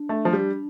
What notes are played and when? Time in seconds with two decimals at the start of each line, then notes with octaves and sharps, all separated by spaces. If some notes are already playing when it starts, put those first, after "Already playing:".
Already playing: D4
0.09 A3
0.25 F3
0.33 G3